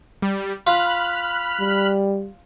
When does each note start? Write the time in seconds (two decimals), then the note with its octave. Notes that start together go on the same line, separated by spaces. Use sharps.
0.22 G3
0.67 F4 B5 F6 F#6
1.60 G3